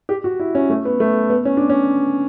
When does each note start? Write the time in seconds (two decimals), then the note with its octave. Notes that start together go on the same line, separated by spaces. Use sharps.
0.09 G4
0.24 F#4
0.40 E4
0.55 C#4
0.70 A3
0.85 B3
1.00 A3
1.30 B3
1.45 C#4
1.57 D4
1.69 C#4